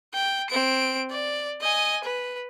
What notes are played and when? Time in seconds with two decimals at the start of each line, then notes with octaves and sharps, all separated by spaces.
0.14 G5
0.50 C4 D7
1.11 D5
1.61 D#5 G#5
2.04 B4